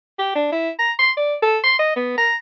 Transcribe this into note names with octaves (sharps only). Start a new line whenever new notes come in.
G4
D4
E4
A#5
C6
D5
A4
C6
D#5
B3
A#5